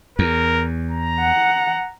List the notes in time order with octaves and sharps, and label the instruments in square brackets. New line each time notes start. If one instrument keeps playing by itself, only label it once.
[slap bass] E2 [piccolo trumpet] A#4
[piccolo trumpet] A#5
[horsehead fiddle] F#5